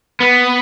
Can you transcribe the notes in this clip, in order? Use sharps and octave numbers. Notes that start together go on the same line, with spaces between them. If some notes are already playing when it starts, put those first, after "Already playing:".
B3